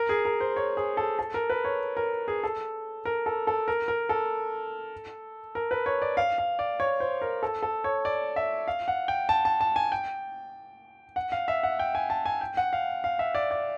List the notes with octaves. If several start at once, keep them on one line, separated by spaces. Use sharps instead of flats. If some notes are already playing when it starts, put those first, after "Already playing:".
Already playing: A#4
G#4
A#4
C5
C#5
G#4
A4
A4
A#4
B4
C#5
A#4
G#4
A4
A#4
A4
A4
A#4
A#4
A4
A#4
B4
C#5
D5
F5
F5
D5
C#5
C5
A#4
A4
A4
C#5
D5
E5
F5
F#5
G5
A5
A5
A5
G#5
G5
F#5
F5
E5
F#5
G5
G#5
A5
G#5
G5
F#5
F5
F5
E5
D5
D5